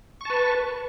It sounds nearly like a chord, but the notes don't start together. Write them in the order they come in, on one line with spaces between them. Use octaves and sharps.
C#6 A5 B4